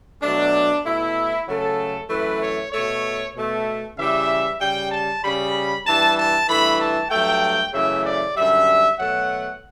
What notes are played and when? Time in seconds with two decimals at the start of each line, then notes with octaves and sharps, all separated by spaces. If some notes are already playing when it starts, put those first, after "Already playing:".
0.22 B2 F#3 A3 D4
0.83 B2 A3 E4
1.47 C#3 F#3 A3 A4
2.09 F#2 E3 A3 B4
2.41 C#5
2.72 B2 A3 C#5
3.35 B2 A3
3.97 C#3 E3 G3 E5
4.60 C#3 G3 G5
4.91 A5
5.23 C#3 G3 B5
5.85 G2 E3 G3 A5
6.16 A5
6.48 G2 E3 A3 B5
6.79 A5
7.10 G2 F#3 A3 G5
7.73 F#2 C#3 E3 A3 E5
8.04 D5
8.36 F#2 D3 G3 E5
8.98 B2 F#3 A3 F#5